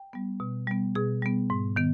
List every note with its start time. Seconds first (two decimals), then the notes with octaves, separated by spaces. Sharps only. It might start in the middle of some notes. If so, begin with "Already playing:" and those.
Already playing: G5
0.13 G3 B3
0.40 B2
0.67 G3 B3
0.95 B2 G#4
1.22 G3 B3
1.50 G#2
1.76 D#3 B3